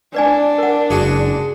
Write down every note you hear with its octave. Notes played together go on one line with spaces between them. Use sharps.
D4 B4 D5 G#5
A#4 F#5
F#1 G#3 F#4 G#4